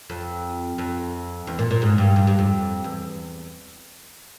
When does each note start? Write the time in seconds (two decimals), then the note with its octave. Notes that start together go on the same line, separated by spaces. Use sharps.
0.10 F2
0.78 F2
1.47 E2
1.59 A#2
1.71 A#2
1.82 G#2
1.98 G2
2.16 G2
2.27 G2
2.39 F2
2.84 E2